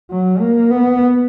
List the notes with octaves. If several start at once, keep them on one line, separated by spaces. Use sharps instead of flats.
F#3
A#3
B3